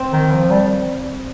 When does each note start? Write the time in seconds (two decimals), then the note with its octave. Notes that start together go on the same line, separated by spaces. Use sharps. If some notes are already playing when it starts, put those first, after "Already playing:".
Already playing: C4
0.12 D#3
0.31 F3
0.50 G3